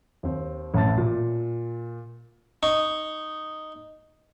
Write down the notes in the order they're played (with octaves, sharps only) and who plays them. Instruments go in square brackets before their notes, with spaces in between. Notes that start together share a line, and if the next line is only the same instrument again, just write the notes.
[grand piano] D#2 C4
A1 A2 A5 A6
A#2
[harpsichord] D#4 C#6